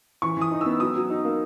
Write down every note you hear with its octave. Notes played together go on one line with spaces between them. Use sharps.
E3 C#6
E3 D#6
D#4
E6
B3
F#3 D#6
F#3
D#4
A#3